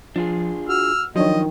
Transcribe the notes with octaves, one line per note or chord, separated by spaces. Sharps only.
F3 D4 F4 G#4
F#4 E6 F6
D#3 F3 F#3 D4 C#5 D#5